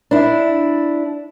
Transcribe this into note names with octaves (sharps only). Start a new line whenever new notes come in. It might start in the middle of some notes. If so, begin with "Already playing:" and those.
D4 E4